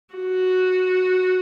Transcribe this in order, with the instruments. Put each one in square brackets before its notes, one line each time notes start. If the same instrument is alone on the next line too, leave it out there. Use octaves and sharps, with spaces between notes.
[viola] F#4